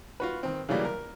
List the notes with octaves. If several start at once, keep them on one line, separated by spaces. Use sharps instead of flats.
F4 F#4 B4
D#3 C4
C#3 E3 F#3 G3 A#3
A#4